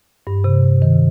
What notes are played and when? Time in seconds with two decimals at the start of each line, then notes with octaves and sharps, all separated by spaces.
0.27 G2
0.44 C3
0.82 D#3